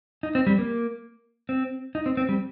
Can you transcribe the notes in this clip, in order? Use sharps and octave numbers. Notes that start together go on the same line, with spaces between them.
D#4
C4
G3
A#3
C4
D#4
C4
C4
G3